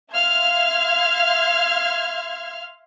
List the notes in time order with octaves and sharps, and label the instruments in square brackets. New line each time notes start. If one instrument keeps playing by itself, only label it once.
[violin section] E5 F5 C6 F6 G#6